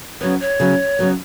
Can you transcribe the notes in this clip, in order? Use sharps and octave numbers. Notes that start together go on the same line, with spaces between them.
C#3 F#3 B3 C#5
C#5
C#3 F#3 B3
C#3 F#3 B3